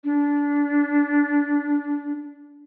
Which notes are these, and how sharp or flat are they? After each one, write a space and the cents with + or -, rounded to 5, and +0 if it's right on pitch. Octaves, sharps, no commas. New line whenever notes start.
D4 -25